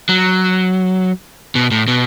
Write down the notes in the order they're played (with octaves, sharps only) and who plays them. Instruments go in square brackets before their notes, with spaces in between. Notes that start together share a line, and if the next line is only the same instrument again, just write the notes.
[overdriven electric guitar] F#3
B2
A2
B2